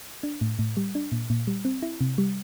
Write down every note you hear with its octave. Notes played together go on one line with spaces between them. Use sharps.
D4
A2
A2
G3
D4
A#2
A#2
G3
C4
E4
C3
G3